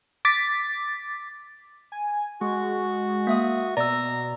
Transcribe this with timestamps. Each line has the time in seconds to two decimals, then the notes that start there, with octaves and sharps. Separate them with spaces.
0.25 D6 A6 B6
1.92 G#5
2.41 G#3 F#4 C#6
3.27 A#3 E5 D#6
3.77 B2 D5 A#5 E6